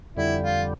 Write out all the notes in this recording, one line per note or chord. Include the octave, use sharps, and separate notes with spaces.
F2 D3 G3 E4
F4